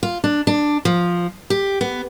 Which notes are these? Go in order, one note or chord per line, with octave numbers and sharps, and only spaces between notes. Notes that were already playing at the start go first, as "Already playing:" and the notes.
F4
D4
D4
F3
G4
B3